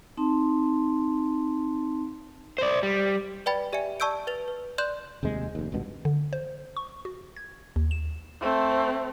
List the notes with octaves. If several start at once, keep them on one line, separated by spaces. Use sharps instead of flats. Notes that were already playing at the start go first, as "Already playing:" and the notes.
C4 D#4 A5 C6
C5 D5
G3
B4 D5 G5 B5 A6
G4 D5 E5 G#5 C#7
D5 A5 C#6 E6 G6 D7
B4 A6 F7
B4
D5 C6 F#6 G6 E7
F1 D#2 C3 G#3
F1 D#2
G#1 C#2 G2 B2
D3
C5
C#6
F#4
G#6
D#2
E7
A3 C4